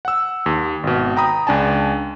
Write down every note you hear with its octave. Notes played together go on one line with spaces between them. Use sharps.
F#5 E6
D#2
G#1 B2
G5 A#5 B5 D#6
C#2 D4 G#5 A5